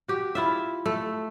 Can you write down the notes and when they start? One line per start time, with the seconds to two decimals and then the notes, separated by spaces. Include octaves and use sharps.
0.08 F#4 G4
0.35 E4 F4 E5
0.86 A3